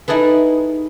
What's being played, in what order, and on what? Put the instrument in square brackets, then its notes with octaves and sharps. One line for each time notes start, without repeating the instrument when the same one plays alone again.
[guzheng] D#4 E4 G#4 A4 B4